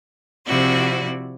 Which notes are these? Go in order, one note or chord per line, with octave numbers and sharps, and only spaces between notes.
C3 F3 C4 E4 F#4 D5